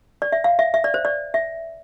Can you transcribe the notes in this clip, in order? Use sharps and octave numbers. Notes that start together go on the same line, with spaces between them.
D5
E5
F5
E5
E5
D5
C5
D5
E5